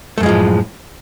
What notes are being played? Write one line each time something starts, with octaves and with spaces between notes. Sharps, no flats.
F#2 A2 F3 G#3 A3